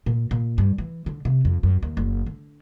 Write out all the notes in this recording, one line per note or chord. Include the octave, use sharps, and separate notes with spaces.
A#2
A#2
G2
E3
D3
C3
F2
F#2
D#2
F#1
D3